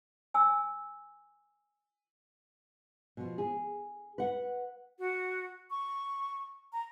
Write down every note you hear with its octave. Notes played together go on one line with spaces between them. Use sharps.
G#5 E6
B2 F3
G#4
B4 F#5
F#4
C#6
A#5